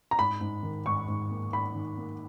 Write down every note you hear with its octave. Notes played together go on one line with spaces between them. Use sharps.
A#5
G#2 B5
G#2
D#3
G#2 C#6
G#2
A#3
G#2 B5
D#3
A#3